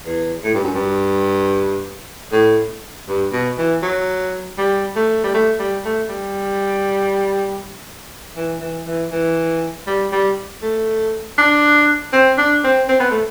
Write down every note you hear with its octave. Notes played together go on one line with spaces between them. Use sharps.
E2
A2
G2
F#2
G2
A2
G2
B2
E3
F#3
G3
A3
G3
A3
G3
A3
G3
E3
E3
E3
E3
G3
G3
A3
D4
C4
D4
C4
C4
B3
A3